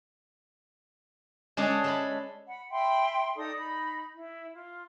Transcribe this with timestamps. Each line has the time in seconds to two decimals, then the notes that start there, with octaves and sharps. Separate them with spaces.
1.57 G#3 C#4 D4 G#4 A4
1.84 G#3 A4 B5
2.48 F#5 B5
2.71 E5 G5 B5 C6
3.36 D#4 A4 D5 D#6
3.57 D#4 B5
4.14 E4
4.54 F4